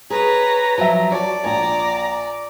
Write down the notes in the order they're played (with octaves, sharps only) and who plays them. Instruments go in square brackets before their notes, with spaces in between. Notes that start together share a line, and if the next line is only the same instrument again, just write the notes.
[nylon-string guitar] G#4 [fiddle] B4 C#5 [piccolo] A#5
[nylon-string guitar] F3 F#3 [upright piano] E5 A5
[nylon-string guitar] F#4 [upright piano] C#5 A5 [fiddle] D5
[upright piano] A#1 G#5 [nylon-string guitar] C#5 [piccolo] A#5